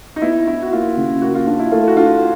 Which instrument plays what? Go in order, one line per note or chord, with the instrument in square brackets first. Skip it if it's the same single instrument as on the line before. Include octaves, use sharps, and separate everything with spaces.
[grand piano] D#4
[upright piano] B3 [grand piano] E4
[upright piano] D4 [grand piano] E4
[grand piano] F#4
[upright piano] A#3 [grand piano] F4
[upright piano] C#3
[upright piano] A#3 [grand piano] F#4
[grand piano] F4
[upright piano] D4 [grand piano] F4
[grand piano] E4
[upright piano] A3 [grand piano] F4
[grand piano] F#4
[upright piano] D4 [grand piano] F4